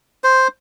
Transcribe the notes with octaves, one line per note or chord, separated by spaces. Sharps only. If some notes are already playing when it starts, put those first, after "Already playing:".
C5